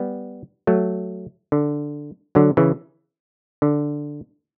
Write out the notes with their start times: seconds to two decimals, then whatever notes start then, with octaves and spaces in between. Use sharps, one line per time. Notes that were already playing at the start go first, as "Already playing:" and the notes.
Already playing: G3 B3
0.67 F#3 A3
1.52 D3
2.35 D3 F#3
2.57 C#3 E3
3.62 D3